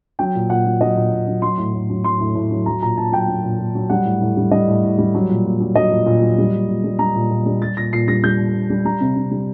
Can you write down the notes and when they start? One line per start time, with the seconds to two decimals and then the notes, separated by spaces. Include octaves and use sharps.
0.19 F#3 G5
0.35 A#2
0.50 A#2 F#5
0.66 F#3
0.81 F#3 D#5
0.96 A#2
1.12 A#2
1.28 F#3
1.42 F#3 C6
1.58 A2
1.74 A2
1.90 F#3
2.04 F#3 C6
2.20 A2
2.35 A2
2.51 F#3
2.66 F#3 A#5
2.82 A#2 A#5
2.97 A#2 A5
3.12 F#3 G5
3.28 F#3
3.43 A#2
3.59 A#2
3.75 F#3
3.90 G3 F#5
4.05 A2
4.21 A2
4.37 G3
4.51 G3 D#5
4.68 A2
4.84 A2
4.98 G3
5.15 F#3
5.29 A#2
5.45 A#2
5.60 F#3
5.75 F#3 D#5
5.91 A#2
6.06 A#2
6.22 F#3
6.38 G3
6.54 A#2
6.69 A#2
6.84 G3
6.99 G3 A#5
7.15 A#2
7.30 A#2
7.46 G3
7.61 G3 A6
7.77 A#2 A#6
7.93 A#2 C7
8.08 G3 A#6
8.23 G3 G6
8.39 A#2
8.54 A#2
8.70 G3
8.85 G3 A#5
9.00 C3
9.16 C3
9.31 G3